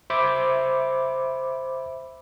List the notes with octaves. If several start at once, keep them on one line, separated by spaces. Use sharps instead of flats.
C5 E5 B5 D6